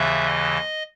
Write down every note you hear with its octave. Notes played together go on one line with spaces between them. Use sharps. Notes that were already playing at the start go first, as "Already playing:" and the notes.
Already playing: D#2 C#3 E3 E5
D#5